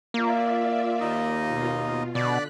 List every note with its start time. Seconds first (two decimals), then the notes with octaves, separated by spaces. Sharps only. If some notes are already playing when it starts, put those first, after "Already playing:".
0.14 A#3 F4 D5 E5
1.00 D#2 D#4 D#5
1.47 B2 F4
2.15 B2 D3 D5 F#6 B6